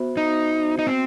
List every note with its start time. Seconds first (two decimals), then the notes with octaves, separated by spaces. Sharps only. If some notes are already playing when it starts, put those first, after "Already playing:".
Already playing: B3 F#4 C5 E5
0.17 D#4
0.79 D#4
0.87 C4